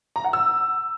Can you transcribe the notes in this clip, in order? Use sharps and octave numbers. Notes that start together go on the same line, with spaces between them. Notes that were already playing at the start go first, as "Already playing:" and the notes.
A#5
F#5
E6